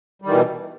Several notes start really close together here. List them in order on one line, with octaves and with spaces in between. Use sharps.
G3 D#3 E3 B2